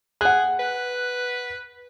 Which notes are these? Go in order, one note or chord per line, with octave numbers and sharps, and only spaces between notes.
G#4 F#5 F#6
B4